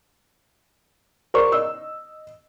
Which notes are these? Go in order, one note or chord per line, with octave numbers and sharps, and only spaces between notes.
A#4 C5 D5 C#6
D#5 E6